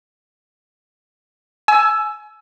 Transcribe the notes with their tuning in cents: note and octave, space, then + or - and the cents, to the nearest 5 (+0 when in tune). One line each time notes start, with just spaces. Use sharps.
G#5 +35 E6 +10